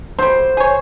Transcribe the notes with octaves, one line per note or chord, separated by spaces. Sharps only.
F#3 G3 C5
G#4 C#5